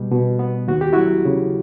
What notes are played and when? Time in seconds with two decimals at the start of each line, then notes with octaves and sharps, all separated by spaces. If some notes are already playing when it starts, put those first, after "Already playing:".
Already playing: B2 G3
0.11 B2
0.39 B3
0.68 D#2 F#4
0.81 G4
0.93 F#3 E4 F#4
1.25 C#3